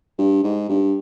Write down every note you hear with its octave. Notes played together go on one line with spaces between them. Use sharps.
G2
G#2
G2